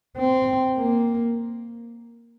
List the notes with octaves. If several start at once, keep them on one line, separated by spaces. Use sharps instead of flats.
C4
A#3